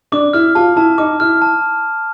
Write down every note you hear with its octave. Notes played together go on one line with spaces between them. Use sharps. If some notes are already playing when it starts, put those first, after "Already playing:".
D4 D6
E4 F6
F4 A5
E4 A5
D#4 D6
E4 F6
A5